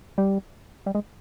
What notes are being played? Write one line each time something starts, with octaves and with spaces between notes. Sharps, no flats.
G3
G3
G#3